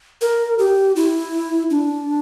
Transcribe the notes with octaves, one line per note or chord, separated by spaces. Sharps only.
A#4
G4
E4
D4